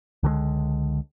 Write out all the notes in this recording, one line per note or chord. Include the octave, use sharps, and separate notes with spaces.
C#2 D3 F#3 G#3